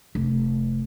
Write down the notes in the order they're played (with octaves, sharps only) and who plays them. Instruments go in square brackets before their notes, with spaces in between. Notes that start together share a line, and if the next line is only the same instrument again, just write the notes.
[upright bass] F1